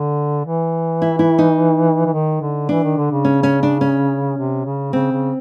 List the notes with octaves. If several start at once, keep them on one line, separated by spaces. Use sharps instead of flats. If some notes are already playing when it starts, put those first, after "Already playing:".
Already playing: D3
E3
E4
E4
D#4
E3
D#3
D3
E3 D4
D#3
D3
C#3
C#4
C#4
D4
C#4
C3
C#3
C#3 C4
C#3